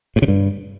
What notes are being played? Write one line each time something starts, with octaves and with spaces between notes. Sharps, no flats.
A2
C#3
G2